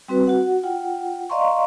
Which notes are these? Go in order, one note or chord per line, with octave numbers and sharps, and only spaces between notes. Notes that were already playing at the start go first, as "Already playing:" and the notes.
G3 C4 F#4 B4
F#4 F#5
F4 F#5 G5
D5 D#5 F5 A#5 C6 C#6